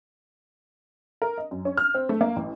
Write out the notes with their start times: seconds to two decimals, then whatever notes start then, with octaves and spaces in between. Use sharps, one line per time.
1.22 A#4
1.38 D#5
1.51 F#2
1.65 C#4
1.77 F6
1.95 C4
2.09 A3
2.21 A#3
2.36 A1